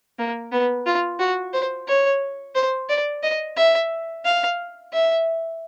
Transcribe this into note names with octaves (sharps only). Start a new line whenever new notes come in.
A#3
B3
F4
F#4
C5
C#5
C5
D5
D#5
E5
F5
E5